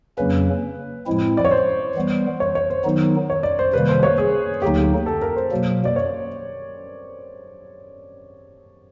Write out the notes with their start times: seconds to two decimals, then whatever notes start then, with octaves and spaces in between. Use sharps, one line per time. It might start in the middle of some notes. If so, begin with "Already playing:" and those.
0.18 F2 C#3 F#3 A#3 C#4 B4
1.07 A2 F3 G#3 C4 E4
1.37 D5
1.45 C#5
1.51 C5
1.95 E3 G3 B3
2.40 C#5
2.55 C#5
2.70 C5
2.85 D#3 F#3 B3 D#4
3.30 C#5
3.43 D5
3.59 C5
3.73 C3 D#3 G3 A#3 B4
3.89 C5
4.03 C#5
4.18 G#4
4.62 D2 D3 F#3 A#3 D#4 G4
5.06 A4
5.22 A#4
5.36 C5
5.52 B2 F#3 A#3
5.85 D5
5.96 C#5